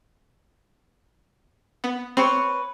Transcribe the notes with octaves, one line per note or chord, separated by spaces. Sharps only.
B3
C4 B4 C#5